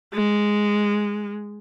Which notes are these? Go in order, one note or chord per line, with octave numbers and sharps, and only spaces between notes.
G#3